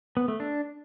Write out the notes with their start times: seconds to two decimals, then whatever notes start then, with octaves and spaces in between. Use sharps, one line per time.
0.17 B3
0.28 A3
0.40 D4